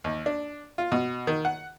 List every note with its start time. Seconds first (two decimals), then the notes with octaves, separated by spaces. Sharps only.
0.04 D#2
0.26 D4
0.78 F4
0.92 B2
1.27 D#3
1.45 F#5